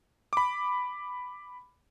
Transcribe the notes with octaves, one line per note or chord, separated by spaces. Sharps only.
B5 D6